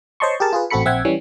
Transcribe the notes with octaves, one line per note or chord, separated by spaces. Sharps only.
C5 C#5 D#5 A5 C6 C#6
G4 G#4 A#4 A5
F4 G#4 B4
A1 C4 F#4 A4 B5 C#7
A#1 C4 E5 F#5 G5 G#6
E3 G3 C#4